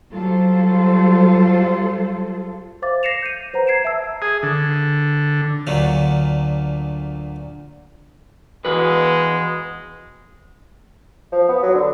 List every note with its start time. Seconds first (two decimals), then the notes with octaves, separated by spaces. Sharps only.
0.12 F#3 G3 F4 A4 C5
2.82 C5 E5 F5 D6 A6
3.03 A#6 C7 C#7 E7 F7
3.22 G6 D#7
3.53 B4 C5 F#5 A#5
3.67 G#6 C7 D7 E7
3.85 E5 A5 E6
4.22 G#4
4.43 D3
5.67 D2 A#2 D3 F#3 A3 A#3
8.65 E2 G#3 F#4 B4
11.33 F3
11.49 B3
11.63 F#3
11.74 D3